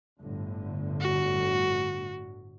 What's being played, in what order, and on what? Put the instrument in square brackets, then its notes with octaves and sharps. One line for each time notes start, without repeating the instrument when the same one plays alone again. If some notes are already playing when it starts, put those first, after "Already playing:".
[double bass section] G1 A2 D3
[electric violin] F#4